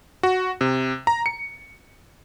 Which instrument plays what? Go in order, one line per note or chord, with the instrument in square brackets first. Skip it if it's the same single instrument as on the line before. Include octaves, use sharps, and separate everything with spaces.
[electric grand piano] F#4
C3
A#5
C#7